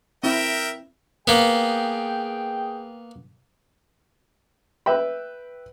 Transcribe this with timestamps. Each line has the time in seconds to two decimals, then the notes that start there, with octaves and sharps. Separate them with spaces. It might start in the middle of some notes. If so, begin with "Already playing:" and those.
0.24 C4 E4 A#4 E5 G5
1.27 A#3 B3 G#4 G5
4.86 B4 E5 G5 B5